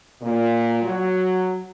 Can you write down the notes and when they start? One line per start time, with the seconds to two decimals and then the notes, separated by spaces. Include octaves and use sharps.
0.21 A#2
0.81 F#3